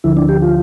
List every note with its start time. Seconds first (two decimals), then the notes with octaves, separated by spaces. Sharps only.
0.04 D2 D3 F3 E4
0.17 D4
0.29 G4
0.42 F4